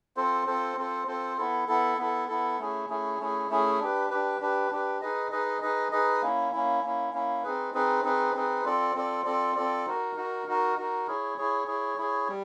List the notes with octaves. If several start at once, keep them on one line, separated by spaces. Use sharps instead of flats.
C4 F4 A4 C5
C4 F4 A4 C5
C4 F4 A4 C5
C4 F4 A4 C5
B3 E4 A4
B3 E4 A4
B3 E4 A4
B3 E4 A4
A3 C#4 E4 G#4
A3 C#4 E4 G#4
A3 C#4 E4 G#4
A3 C#4 E4 G#4
D4 G4 B4
D4 G4 B4
D4 G4 B4
D4 G4 B4
D#4 G#4 B4 D#5
D#4 G#4 B4 D#5
D#4 G#4 B4 D#5
D#4 G#4 B4 D#5
A#3 C#4 E4
A#3 C#4 E4
A#3 C#4 E4
A#3 C#4 E4
C4 D#4 G#4 B4
C4 D#4 G#4 B4
C4 D#4 G#4 B4
C4 D#4 G#4 B4
C4 F4 A4 D5
C4 F4 A4 D5
C4 F4 A4 D5
C4 F4 A4 D5
D#4 F#4 A#4
D#4 F#4 A#4
D#4 F#4 A#4
D#4 F#4 A#4
E4 G#4 C#5
E4 G#4 C#5
E4 G#4 C#5
E4 G#4 C#5
G3